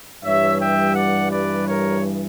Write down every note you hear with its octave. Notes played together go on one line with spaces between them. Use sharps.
G2 E3 G3 C#5 E5
E5 G5
D5 F#5
B4 D5
A#4 C#5